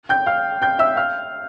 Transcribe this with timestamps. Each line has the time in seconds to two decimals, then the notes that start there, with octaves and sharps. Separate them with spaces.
0.09 G5 G6
0.26 F5 F6
0.62 G5 G6
0.79 E5 E6
0.96 F5 F6